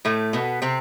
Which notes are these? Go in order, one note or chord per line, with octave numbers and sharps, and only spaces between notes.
A2 A3
B2 B3
C3 C4